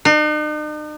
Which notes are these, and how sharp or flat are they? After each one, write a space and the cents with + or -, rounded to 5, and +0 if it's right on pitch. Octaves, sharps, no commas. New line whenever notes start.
D#4 -45